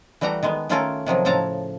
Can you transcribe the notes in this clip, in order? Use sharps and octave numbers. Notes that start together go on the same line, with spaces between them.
E3 G3 A3 F#4 A#5
D#3 G#3 B3
D#3 A3 C#4 F4 A4 A#4
C3 D#3 F3 F#3
A2 C#3 F3 A4 A5 A#5